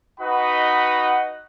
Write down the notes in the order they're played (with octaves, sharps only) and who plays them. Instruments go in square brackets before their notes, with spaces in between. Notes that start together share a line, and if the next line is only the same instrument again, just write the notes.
[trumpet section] D#4 F#4 B4 D#5 F#5 B5